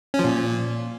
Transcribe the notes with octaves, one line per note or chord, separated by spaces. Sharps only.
C#4
F3
A#2